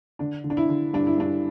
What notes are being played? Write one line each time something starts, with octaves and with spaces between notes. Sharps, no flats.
D3 D4
D3
D4
E4
D3
G2 D4
E4
G2 D4